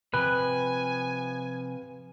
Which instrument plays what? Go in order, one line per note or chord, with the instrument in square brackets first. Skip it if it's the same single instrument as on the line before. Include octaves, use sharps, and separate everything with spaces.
[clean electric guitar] C3 F3 [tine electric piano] B4 [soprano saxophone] G#5